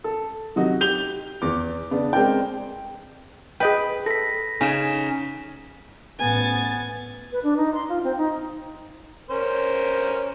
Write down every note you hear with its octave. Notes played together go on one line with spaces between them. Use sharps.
A4
C3 F#3 D#4 F#4
G4 G6 F7 G7
E2 D6
C#3 B3 D4
G#3 C4 A#4 D5 G5
G#4 B4 D#5 G5
A4 A#6 B6
C#3 C#4 D#4 G#5 B6 E7
A1 B3 G#5 A6
B4
D4
D#4
C6
F4
C4
D#4
C#4 A#4 C5